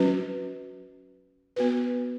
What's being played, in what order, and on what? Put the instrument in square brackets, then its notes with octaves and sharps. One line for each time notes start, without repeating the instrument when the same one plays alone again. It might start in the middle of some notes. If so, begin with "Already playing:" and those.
Already playing: [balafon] F#3 C#4 F#4 B4
B3 F#4 B4